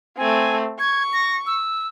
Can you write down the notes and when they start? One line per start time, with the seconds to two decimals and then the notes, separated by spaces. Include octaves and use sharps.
0.17 A3 C4 G#5
0.80 C#6 G#6
1.13 A#6
1.47 E6